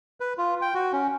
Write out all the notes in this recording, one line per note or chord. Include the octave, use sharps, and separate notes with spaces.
B4
F4
G5
F#4
C#4